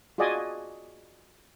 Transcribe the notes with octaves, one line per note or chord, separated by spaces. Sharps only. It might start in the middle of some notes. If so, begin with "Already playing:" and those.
F4 F#4 G#4 D5 D#5 G#5